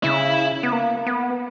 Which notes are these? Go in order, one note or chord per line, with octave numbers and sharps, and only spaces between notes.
C#3 E4
B3
A#3
B3